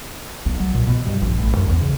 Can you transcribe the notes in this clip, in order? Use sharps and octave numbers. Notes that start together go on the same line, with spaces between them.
B1
F#3
A#2
B2
G2
A#1
A1
F#2
E2
C#3